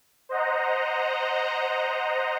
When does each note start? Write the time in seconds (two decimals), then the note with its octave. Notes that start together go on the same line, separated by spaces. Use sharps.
0.29 C5 D#5 F#5 A#5